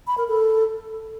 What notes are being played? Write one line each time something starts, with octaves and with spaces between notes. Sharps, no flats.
B5
A#4
A4